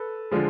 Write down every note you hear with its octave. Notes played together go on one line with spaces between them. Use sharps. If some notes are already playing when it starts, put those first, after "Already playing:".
Already playing: A4 B4
D3 F3 G#3